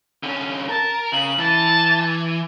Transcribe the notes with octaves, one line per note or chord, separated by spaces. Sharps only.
D3 C#4
A#4 A5
C#3 F#7
E3 A5